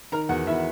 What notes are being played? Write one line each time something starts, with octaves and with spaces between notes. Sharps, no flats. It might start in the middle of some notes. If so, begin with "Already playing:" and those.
D#3 A#4 A#5
E2 F#4 F#5
E2 E4 E5